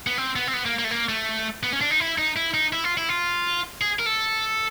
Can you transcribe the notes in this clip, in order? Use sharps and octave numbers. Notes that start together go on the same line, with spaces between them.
B3
C4
B3
C4
B3
A#3
A#3
A3
A#3
A3
B3
C#4
D4
D#4
E4
D#4
E4
D#4
E4
F4
E4
F4
G#4
A#4
A4